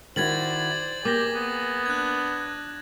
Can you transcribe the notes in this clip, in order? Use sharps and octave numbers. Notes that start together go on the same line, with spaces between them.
D#3 E4 F#4 C5 D5 G#6 A6 F#7
A#3 G4 G#4 D6 A6 A#6
B3
D4 F#6 G#6